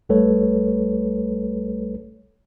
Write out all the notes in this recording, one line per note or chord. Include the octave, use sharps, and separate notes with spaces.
A#1 G3 A3 A4 B4 C#5